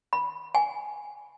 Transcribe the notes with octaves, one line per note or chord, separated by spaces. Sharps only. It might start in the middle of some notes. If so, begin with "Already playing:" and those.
B5
G#5